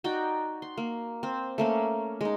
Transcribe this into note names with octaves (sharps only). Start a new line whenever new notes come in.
D#4 F#4 D5 G5
C6
A#3
C4
A3 A#3 C#4
G#3 D#4